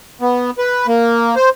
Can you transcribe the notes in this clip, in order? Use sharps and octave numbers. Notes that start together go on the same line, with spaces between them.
B3
B4
A#3
C5